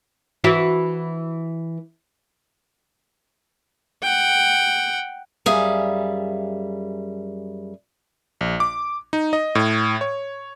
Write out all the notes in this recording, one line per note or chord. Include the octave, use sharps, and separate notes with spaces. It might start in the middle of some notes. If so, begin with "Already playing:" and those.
E3 E4 F#4
F#5 G5
F#2 G3 G#4 E5 F5
A#1
D6
D#4
D#5
A2
C#5